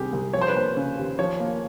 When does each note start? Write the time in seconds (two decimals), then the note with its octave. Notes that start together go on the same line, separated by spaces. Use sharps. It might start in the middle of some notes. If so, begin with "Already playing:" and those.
Already playing: C2 C3 D#3 G4 G#4
0.13 C2
0.33 F3 C#5
0.41 C5
0.48 B4
0.55 A#3 C5
0.77 C#3
0.98 D#2
1.19 F3 C#5
1.40 A#3